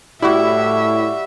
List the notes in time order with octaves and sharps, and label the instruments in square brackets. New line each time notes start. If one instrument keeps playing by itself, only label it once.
[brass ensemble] A2 [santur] G3 F#4 [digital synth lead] E4 [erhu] E5